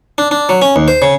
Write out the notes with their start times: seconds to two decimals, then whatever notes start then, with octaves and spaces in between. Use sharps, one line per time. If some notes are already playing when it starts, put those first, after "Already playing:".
0.18 D4
0.31 D4
0.49 F#3
0.62 C#4
0.76 D#2
0.88 C5
1.02 C#3